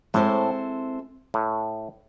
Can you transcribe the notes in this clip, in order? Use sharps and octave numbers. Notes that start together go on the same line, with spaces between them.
A2 G#3 C4 E4 A4 C5
A2